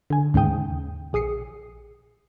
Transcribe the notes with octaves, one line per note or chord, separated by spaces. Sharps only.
D3 G#5
D#2 G#2 C#3 G5 D#6
A#1 G#4 D#6 C7 C#7